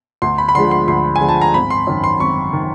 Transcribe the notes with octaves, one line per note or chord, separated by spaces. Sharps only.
D2 C6
B5
B5
D3 F3 G#3 C6
C6
D2 C6
G#5
D3 F3 G#3
A5
A#5
G#1 B5
C6
F#2 D#3
C6
G#1 C#6
D#3